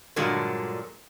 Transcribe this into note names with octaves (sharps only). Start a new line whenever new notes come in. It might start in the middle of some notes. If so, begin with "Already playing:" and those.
G2 A#2 D3 F#3 G#3